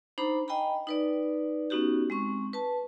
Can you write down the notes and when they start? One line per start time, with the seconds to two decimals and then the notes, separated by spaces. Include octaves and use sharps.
0.18 D4 D#4 C5 A#5 B5
0.48 D#5 G5 G#5 A#5 B5
0.87 D#4 B4 D5
1.70 B3 C#4 D#4 F#4 G4
2.10 G#3 C4 C#6
2.53 B4 A5